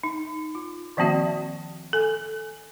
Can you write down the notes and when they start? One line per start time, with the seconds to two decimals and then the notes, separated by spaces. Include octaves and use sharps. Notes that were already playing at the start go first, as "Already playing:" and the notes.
0.03 D#4
0.55 F4
0.97 D#3 F3 A#3 C4 F#4 E5
1.93 A4 G#5